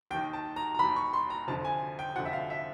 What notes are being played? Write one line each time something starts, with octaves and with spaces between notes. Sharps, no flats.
D#2 D#3 G5
A5
A#5
A#5
D#2 D#3 B5
C#6
C6
A#5
F1 F2 D3 F3 A5
G#5
G5
F1 F2 D3 F3 F#5
E5
F5
E5